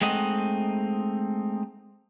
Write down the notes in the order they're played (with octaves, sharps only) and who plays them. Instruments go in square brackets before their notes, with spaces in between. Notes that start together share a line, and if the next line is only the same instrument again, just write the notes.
[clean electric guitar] G#3 A3 C4 D#4 D#5 F#5